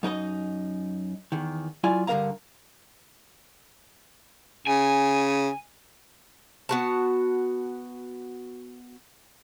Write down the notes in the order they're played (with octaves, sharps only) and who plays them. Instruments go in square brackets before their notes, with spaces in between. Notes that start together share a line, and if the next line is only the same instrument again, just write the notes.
[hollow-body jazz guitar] F#2 D#4 A#4 D#5
E2 D#3
F#3 E4 F4 D5 G#5
G2 D3 E3 A#4 F5 A#5
[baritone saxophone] C#3 [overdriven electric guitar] G#5
[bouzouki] B3 F#4 A5